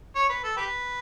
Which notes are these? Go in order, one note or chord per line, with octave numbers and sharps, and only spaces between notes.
C#5
B4
A4
G4 B4